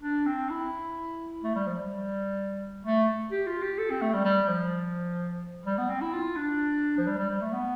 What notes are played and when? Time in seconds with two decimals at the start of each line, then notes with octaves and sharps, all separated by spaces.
0.02 D4
0.26 C4
0.49 E4
1.43 A3
1.55 G3
1.67 F3
1.79 G3
2.85 A3
3.32 G4
3.46 F4
3.62 G4
3.78 A4
3.90 C4
4.01 A3
4.14 G3
4.24 G3
4.48 F3
5.65 G3
5.78 B3
5.89 C4
6.01 E4
6.13 F4
6.36 D4
6.98 F3
7.07 G3
7.18 G3
7.30 G3
7.41 A3
7.53 B3